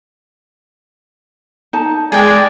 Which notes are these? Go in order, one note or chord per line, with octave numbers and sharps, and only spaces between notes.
D#4 A5
G#3 D5 G5 G#5